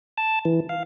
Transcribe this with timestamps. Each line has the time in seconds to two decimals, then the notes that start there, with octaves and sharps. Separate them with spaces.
0.18 A5
0.45 E3
0.69 F5